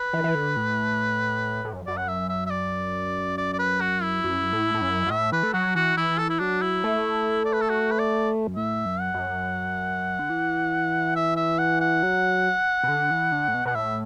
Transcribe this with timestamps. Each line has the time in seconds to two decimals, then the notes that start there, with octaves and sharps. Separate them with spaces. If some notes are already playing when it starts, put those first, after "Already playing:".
Already playing: B4
0.13 E3
0.24 E3
0.35 D3
0.57 A2
1.65 A2
1.73 F#2
1.87 F#2 D5
1.97 F#5
2.08 E5
2.29 E5
2.46 E5
2.50 D5
3.38 D5
3.53 D5
3.59 B4
3.81 F#4
4.02 E4
4.24 F#2
4.53 A2
4.74 A2
4.81 F#2
5.06 F#2
5.10 A2 E5
5.32 E3 B4
5.43 A3
5.53 F#3 F#4
5.75 E3 F#4
5.97 E3 E4
6.18 A4
6.30 E4
6.40 F#3 D4
6.62 E4
6.84 A3
7.45 D5
7.53 B4
7.61 A4
7.70 F#4
7.91 B4
7.99 D5
8.47 F#2
8.56 A2 E5
8.86 F#2
9.00 F#5
9.14 F#2
10.19 D3
10.30 E3
11.16 E5
11.37 E5
11.59 F#5
11.81 F#5
12.03 F#3
12.83 B2
12.88 D3
13.11 E3
13.32 D3
13.48 A2
13.54 B2
13.65 B2 F#5
13.75 A2 E5